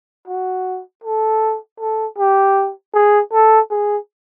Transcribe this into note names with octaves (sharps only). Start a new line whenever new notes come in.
F#4
A4
A4
G4
G#4
A4
G#4